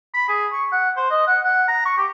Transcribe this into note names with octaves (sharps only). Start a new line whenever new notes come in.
B5
G#4
C#6
F#5
C5
D#5
F#5
F#5
A#5
C#6
G4